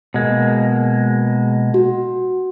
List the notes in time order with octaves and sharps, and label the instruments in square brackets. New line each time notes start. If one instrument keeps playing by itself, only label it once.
[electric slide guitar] B2 G#3 A#3
[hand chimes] F#4